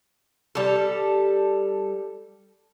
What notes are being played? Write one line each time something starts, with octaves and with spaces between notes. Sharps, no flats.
G3 A4